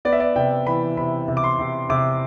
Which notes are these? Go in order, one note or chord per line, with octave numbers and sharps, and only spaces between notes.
B3 D5
E5
D5
C3 G5
E3 B5
C3 B5
C3
D6
C6
C3
C3 D6